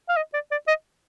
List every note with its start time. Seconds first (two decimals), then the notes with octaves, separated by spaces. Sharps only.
0.09 F5
0.16 D#5
0.34 D5
0.51 D5
0.68 D#5